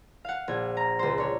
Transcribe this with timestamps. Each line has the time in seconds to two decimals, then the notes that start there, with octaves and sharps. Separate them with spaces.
0.25 F5 F#5
0.48 A#1 G#6
0.77 A#5
0.99 C#2 C5
1.18 D4 C#5